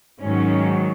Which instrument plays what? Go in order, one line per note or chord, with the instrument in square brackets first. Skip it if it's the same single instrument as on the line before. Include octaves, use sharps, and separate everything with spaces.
[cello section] G#2 D#3 F#3 C#4